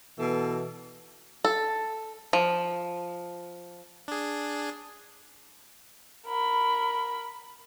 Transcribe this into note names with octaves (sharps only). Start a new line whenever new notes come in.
B2 E3 A4
A4
F3
D4 G#4
A#4 B5